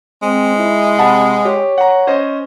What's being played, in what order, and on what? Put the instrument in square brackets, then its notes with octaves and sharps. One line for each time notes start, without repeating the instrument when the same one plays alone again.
[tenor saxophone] G#3 [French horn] C4
[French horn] E4
[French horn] C3 [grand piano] F#5 A5 B5
[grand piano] G4 [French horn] C#5
[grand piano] F#5 A#5
C#4 C5 D#5